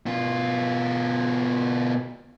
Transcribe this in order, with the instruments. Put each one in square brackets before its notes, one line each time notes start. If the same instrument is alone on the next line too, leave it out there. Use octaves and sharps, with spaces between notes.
[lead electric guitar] B2 F4